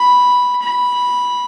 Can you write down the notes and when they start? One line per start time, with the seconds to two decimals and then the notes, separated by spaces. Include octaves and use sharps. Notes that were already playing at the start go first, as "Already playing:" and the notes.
Already playing: B5
0.62 B5